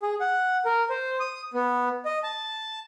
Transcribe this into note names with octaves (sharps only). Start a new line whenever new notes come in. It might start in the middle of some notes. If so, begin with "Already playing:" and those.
G#4
F#5
A#4
C5
D#6
B3
D#5
A5